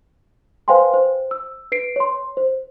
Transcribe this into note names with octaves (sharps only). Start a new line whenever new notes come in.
B4 C5 F5 G5 G#5 C6
C5
E6
B4 C7 D7
C#5 C6
C5